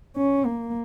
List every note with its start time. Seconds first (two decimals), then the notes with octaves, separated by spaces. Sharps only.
0.17 C#4
0.46 A#3